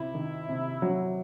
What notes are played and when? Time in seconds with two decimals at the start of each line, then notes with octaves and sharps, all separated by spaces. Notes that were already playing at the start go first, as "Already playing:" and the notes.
Already playing: C3 E4
0.14 D#3
0.48 C3
0.82 F#3